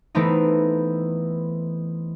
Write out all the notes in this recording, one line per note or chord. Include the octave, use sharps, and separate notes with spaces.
E3 A3 B3 C4 D#4